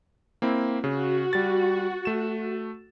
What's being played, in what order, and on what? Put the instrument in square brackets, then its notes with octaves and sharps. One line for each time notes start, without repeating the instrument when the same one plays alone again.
[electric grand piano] A#3 C4 E4
[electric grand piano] C#3 [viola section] F#4
[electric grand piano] G3 A6
A3 E7